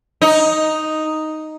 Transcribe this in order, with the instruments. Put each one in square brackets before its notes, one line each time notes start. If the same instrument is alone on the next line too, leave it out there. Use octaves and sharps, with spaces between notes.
[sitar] D#4